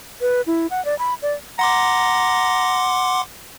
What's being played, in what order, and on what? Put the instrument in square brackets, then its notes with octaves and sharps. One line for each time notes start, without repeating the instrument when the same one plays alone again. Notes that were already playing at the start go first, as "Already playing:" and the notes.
[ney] B4
E4
F#5
D5
B5
D5
[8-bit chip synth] F#5 C6 D6 [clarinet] A#5